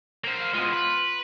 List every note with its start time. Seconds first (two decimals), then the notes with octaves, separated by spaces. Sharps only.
0.24 A#3 C5
0.40 F5
0.54 B2 G#3 F4
0.73 B4